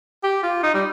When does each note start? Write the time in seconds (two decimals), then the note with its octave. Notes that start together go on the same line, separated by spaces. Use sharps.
0.23 G4
0.43 F4
0.63 D#4
0.74 G3